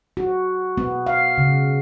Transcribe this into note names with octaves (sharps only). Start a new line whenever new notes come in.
F#4
B3
F5
C#3